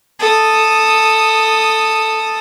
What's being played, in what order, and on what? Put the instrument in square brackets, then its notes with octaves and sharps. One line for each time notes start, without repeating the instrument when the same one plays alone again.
[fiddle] A4 D#6